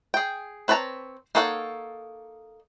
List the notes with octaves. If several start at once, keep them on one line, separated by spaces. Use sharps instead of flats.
G#4 G5
C4 B4 C#5 A5 A#5
A#3 D#4 A4 C#5 F#5